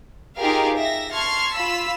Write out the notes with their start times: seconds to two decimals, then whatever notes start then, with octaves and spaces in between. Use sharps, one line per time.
0.37 D#4 F4 G4 G#4 A#4 F5
0.77 E5 A#6
1.12 A5 C6 C#6 F6 G#6
1.53 F4 B5 E6 B6